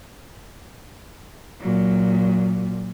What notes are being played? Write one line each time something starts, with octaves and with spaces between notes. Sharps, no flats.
A#2 F#3